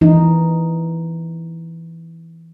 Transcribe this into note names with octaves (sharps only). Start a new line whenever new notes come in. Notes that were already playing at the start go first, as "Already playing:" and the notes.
E3 D#4